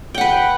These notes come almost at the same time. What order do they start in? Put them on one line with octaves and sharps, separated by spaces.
G5 F#5 B4